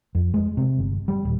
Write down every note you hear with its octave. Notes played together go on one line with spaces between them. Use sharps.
F2
G#3
C3
G1
G3
D#1